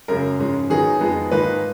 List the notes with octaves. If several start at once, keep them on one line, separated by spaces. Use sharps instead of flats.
F#2 C#3 G#3 A#4
G#2 F3 G#3 C#4
D#3 F#3 B3 D#4 G#4
F2 F3 G#3 B3 D#4
G#2 D#3 A#3 D#4 B4